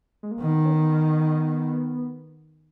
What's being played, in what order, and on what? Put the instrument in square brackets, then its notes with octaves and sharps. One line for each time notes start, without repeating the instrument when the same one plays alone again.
[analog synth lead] G#3
A#3
[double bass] D#3 [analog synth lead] B3
[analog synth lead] C#4
B3